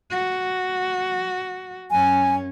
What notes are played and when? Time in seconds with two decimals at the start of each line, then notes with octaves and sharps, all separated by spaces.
0.11 F#4
1.91 F#2 C#4 G#5